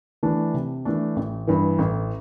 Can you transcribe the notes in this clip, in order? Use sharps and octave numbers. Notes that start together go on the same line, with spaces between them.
E3 A3 D4
C3
E3 A3 D4
A1
G2 E3 B3
A1